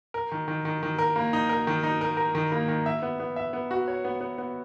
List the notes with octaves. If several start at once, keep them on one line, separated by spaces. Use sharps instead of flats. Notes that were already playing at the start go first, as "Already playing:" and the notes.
A#4
D#3
D#3
D#3
D#3
A#4
A#3
D#4
A#4
D#3
D#4
A#4
A#4
D#3
A#3
D#3
E5
B3
B3
E5
B3
F#4
C#5
B3
B3
B3